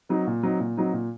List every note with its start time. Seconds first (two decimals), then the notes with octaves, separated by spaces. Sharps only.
0.09 F#3 C4 D#4
0.27 A#2
0.43 F#3 C4 D#4
0.60 A#2
0.77 F#3 C4 D#4
0.93 A#2